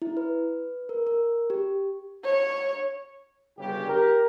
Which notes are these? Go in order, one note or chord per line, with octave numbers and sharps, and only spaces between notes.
E4
B4
A#4
A#4
G4
C#5
G1 C#3 G4
G4 A#4